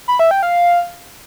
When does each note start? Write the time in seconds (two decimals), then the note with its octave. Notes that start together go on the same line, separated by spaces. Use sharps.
0.08 B5
0.19 E5
0.31 G5
0.43 F5